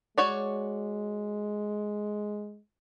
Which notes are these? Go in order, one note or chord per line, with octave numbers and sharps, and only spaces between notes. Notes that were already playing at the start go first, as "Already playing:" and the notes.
G#3 F#4 C#5 D5